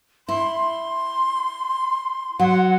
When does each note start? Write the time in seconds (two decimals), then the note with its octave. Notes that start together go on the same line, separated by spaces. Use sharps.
0.29 E4 C6
2.40 F#3 F#5